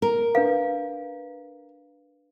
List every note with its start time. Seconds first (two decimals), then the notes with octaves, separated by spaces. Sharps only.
0.02 A#4
0.35 D4 B4 F5